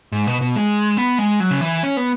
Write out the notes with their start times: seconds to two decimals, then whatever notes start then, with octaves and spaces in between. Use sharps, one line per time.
0.12 G#2
0.27 B2
0.41 B2
0.56 G#3
0.97 B3
1.18 G#3
1.40 F#3
1.51 C#3
1.61 E3
1.83 C#4
1.97 B3